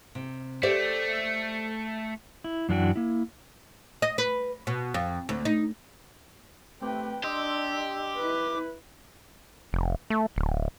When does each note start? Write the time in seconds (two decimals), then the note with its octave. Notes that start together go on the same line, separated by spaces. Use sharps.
0.15 C3
0.63 A3 G4 C5 D5
2.44 E4
2.69 F#2 E3 D4 F#4 G5
2.96 A#3 E4
4.02 D#5
4.18 B4
4.67 B2
4.94 F2
5.29 D2
5.45 D#4
6.81 A3 C4 G4 B4 G5
7.24 D4 G4 D#5 C6 E6
8.17 E4 B4
9.73 F1
10.10 A3
10.36 D1